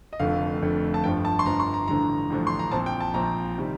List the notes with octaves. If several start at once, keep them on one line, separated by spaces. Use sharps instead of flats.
D#5
F1 F2 D3 A3 F5
F1 F2 D3 A3
A5
G1 G2 F3 G5
A5
C6
G1 G2 F3 A#5
C6
A#5
A1 G2 D3 F3 A#5
A1 G2 D3 F3
C6
A#5
A#1 A#2 F3 C4 A5
G5
A5
A#1 A#2 F3 C4 A#5
C3 D#3 G3